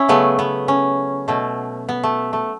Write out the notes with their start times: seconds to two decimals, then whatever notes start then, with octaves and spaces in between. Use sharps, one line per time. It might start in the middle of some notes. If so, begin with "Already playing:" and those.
Already playing: C#4 E4
0.09 C#3 F#3 A3 B3
0.39 B3
0.68 C#4
1.28 B2 A3
1.89 B3
2.03 A3
2.33 A3